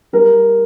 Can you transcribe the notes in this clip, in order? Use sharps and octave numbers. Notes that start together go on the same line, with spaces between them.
G3 A#4